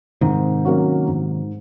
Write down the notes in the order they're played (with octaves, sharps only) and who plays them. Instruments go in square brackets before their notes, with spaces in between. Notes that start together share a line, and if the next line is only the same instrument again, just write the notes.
[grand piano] G#2 [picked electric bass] C3 D#3
[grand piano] F#3 A#3 C#4 F#4
G#2